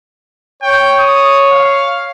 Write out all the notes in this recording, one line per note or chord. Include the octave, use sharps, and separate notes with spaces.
C#5 G5
D#6
F5